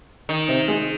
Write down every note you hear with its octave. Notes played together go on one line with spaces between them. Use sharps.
D#3
C3 C4
G#3 G#4